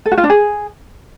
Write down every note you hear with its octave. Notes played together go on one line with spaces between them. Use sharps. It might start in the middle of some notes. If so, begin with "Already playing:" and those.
A4
F#4
F4
D4
G#4